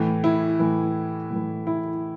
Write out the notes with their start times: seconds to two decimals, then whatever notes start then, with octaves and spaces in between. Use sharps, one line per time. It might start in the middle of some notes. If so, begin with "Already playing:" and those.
Already playing: A2 E3
0.24 E4
0.59 A2 E3
1.31 A2 E3
1.67 E4